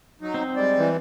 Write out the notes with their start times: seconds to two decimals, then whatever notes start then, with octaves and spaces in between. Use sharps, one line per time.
0.21 F#3 D#4
0.34 C4
0.56 G3 G#3 D5
0.79 E3